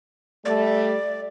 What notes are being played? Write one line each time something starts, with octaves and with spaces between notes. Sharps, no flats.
G3 A3 D5